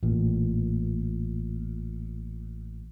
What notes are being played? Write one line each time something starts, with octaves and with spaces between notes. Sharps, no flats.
A1 A#2